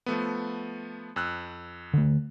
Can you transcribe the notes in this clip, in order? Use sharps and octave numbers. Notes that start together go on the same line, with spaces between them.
F3 A3 B3
F2 E6 F#6
D3 A3